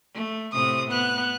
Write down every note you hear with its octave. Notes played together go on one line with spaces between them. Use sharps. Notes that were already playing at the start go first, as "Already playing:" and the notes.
A3
A2 C3 D#6
B3 F#6